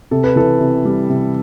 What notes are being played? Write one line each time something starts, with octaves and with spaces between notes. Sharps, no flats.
C3 A4
B4
E3 A4
C3
G3
C3